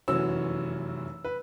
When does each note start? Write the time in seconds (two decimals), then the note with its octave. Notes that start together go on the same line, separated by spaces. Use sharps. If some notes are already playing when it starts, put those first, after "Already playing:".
0.08 F1 F#2 E3 C#4 F#4 E6
1.24 B4